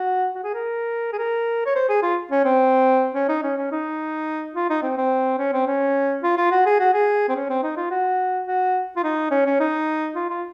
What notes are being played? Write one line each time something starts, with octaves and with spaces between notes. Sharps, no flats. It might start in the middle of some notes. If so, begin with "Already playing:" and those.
Already playing: F#4
F#4
G#4
A#4
G#4
A#4
C#5
C5
G#4
F4
C#4
C4
C#4
D#4
C#4
C#4
D#4
F4
D#4
C4
C4
C#4
C4
C#4
F4
F4
F#4
G#4
F#4
G#4
C4
C#4
C4
D#4
F4
F#4
F#4
F4
D#4
C#4
C#4
D#4
F4
F4